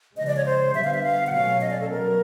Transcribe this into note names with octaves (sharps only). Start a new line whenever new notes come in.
C#3 F3 G#3 D#5
D5
C#5
C5
D3 G3 B3 E5
F5
E5
F5
F#5
B2 F#3 A3 C#4 F5
D#5
D5
A4
F#3 B3 A#4